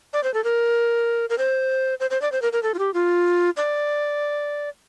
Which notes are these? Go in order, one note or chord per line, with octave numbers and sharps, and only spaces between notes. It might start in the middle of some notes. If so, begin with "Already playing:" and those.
D5
C5
A4
A#4
A#4
C5
C5
C5
D5
C5
A#4
A#4
A4
F4
G4
F4
D5